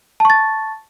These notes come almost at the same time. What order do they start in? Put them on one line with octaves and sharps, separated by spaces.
A5 C#6 A6